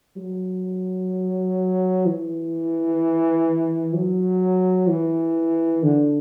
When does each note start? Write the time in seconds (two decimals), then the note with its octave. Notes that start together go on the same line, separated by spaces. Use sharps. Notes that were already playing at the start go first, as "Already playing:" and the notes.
0.17 F#3
2.06 E3
3.94 F#3
4.89 E3
5.83 D3